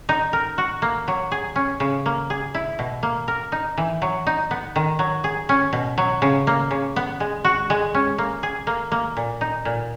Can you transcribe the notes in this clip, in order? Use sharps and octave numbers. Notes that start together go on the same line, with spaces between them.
D#4
A#4
F#4
A#3
F#3
G#4
C#4
C#3
A#3
G#4
E4
B2
A#3
A#4
D#4
E3
F#3
D#4
B3
D#3
F#3
G#4
C#4
B2
F#3
C#3
A#3
C#3
B3
G#3
F#4
G#3
C#4
A#3
G#4
A#3
A#3
A#2
D#4
A#2